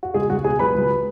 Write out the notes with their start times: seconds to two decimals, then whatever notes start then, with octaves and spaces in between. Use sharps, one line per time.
0.03 F#4
0.14 C#2 G#3 G#4
0.30 C#2 F#4 F#5
0.44 B2 G#4 G#5
0.59 F#3 B4 B5
0.75 C#2